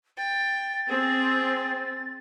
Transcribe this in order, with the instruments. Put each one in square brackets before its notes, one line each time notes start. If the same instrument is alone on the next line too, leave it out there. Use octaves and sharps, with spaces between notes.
[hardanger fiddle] G5 [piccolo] A6
[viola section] C4 [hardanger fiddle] G#4